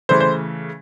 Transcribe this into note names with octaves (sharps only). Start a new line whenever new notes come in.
C#3 E3 A3 C5
C5